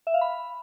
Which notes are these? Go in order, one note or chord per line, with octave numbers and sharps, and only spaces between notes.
E5
F5
B5